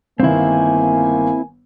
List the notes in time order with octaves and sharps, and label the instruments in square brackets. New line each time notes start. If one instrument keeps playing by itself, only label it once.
[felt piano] G1 D#3 [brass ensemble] A#3 G#5 [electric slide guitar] C4 E4